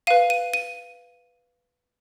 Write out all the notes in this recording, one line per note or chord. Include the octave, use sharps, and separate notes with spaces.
B4 F5 D#7
D#7
D#7